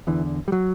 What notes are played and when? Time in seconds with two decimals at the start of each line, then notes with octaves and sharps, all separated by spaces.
0.07 E2 D3 E3
0.48 G3
0.52 F#3